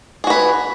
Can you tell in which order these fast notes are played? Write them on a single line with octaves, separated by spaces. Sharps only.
G#4 F#4 B4